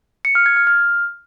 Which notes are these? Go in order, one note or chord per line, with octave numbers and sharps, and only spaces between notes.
C#7
F6
G#6
F6
F6